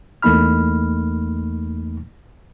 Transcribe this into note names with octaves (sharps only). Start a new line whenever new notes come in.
E2 A3 A#3 D#4 B5 F6